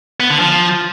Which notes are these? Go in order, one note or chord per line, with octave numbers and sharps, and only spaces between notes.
B3
D3
F3